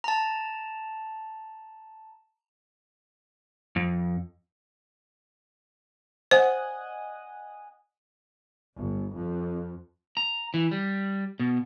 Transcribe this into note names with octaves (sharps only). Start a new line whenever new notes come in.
A5 A#5
F2
C5 D#5 F#5 G#5
G1
F2
A#5
E3
G3
B2